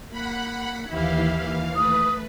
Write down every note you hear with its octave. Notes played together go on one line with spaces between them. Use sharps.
A#3 F#5 B5
D#2 E3 E4 G4 F5
A3 B4 D#6